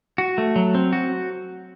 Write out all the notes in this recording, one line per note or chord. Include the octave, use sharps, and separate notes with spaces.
F#4
A3
F#3
C4
F#4